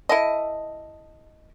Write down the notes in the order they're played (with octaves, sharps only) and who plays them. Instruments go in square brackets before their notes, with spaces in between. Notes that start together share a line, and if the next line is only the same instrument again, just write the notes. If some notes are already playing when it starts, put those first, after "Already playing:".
[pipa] E4 A4 D#5